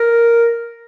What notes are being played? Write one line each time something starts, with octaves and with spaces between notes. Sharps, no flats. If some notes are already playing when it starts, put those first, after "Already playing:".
Already playing: A#4